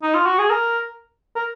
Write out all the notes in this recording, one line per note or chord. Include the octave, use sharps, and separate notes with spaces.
D#4
F4
F#4
G#4
A#4
A#4